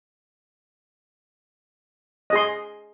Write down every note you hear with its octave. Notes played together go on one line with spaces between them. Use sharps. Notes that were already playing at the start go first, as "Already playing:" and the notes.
G#4 D#5 C6